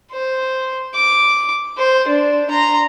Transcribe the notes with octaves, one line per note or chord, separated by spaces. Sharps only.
C5
D6
C5
D4
A#5 C6